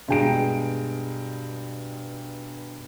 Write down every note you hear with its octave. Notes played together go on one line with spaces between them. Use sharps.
G2 B2 G#3 G5 A#5 D7